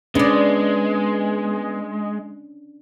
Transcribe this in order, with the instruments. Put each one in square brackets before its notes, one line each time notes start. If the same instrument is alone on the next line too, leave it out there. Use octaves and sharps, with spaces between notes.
[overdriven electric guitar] G#3 [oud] B3 D5 [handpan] C#4 D4